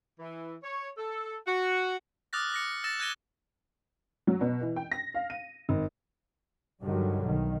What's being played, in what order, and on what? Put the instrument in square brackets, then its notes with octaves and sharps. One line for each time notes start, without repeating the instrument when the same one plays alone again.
[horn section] E3
C#5
A4
F#4
[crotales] D6 D#6 F6 F#6 A6 A#6
D6 A#6 C#7
E6 A6 A#6 E7
F#6 G#6 A#6 D#7 G7
[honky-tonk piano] F#3
B2
E3
G5
A#6
F5
D#7
G#1
[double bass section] G2 D3 D#3 F#3 G3
B1 D#3